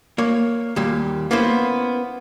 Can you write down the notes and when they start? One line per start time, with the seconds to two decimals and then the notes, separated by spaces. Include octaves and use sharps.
0.18 A#3 C#5
0.76 D#2 A#2 G3
1.31 A#3 B3 C#4 E4 C5